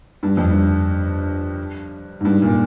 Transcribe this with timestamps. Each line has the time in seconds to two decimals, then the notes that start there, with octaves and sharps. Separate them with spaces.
0.23 G2
0.37 F2
0.51 G2
2.21 G#2
2.25 G2
2.42 A#2